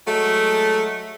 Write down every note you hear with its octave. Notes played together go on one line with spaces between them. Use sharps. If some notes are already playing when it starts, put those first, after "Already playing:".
F#3 G#3 A3